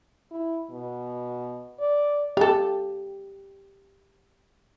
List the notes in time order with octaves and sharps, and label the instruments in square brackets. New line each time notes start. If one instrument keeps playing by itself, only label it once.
[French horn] E4
B2
D5
[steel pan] G4 [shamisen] A4 F5